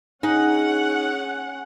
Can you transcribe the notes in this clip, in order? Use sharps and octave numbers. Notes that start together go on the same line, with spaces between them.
C#4 D#4 G#4 F#5